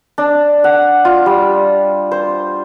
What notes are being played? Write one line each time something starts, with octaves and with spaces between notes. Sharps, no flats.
D4
F#5
F4
G3
C5